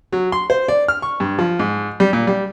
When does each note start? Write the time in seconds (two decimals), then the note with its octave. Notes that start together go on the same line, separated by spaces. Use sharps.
0.12 F#3
0.32 C6
0.50 C5
0.68 D5
0.88 F6
1.02 C#6
1.20 G2
1.39 F3
1.59 G#2
2.00 G3
2.13 A#2
2.27 G3